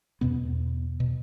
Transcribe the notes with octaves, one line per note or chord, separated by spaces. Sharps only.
E2 B2 B3
B2